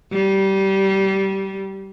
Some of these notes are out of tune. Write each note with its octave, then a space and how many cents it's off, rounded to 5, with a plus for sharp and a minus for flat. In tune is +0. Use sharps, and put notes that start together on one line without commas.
G3 -20